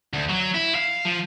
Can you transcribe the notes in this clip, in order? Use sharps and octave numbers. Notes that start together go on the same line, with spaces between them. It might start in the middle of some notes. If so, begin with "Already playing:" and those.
D2
F#3
E4
F5
F3